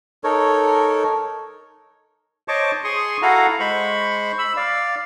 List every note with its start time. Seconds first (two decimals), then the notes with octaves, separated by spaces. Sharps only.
0.24 D#4 A4 A#4 C#5
2.48 C5 C#5 D#5 A5 C#6 D6
2.84 G#4 C6 C#6 D#6
3.22 E4 F#4 A4 F5 F#5 A#5
3.60 G#3 C5 B5 C#6
4.38 B5 E6
4.57 D5 F5